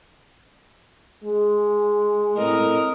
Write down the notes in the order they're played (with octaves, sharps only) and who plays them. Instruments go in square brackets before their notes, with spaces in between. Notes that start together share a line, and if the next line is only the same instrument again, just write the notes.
[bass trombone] G#3
[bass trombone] A2 [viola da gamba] C4 A#4 D#5